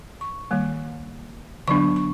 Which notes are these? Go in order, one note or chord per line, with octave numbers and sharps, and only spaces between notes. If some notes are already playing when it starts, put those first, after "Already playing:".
C#6
D#3 G3 A#3
D3 F#3 B3 D4 C#6
C#6